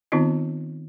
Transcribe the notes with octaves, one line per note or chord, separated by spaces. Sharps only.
D#3 B3 C4 D#4 F4 D#5